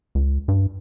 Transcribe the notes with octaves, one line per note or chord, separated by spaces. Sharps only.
C#2
G2